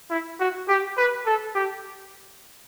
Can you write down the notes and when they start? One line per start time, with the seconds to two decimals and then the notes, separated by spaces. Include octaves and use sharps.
0.10 E4
0.40 F#4
0.68 G4
0.97 B4
1.26 A4
1.55 G4